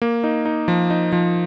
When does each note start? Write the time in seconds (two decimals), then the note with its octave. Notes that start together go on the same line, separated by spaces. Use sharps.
0.02 A#3
0.24 D#4
0.46 D#4
0.68 F3
0.90 D#4
1.12 F3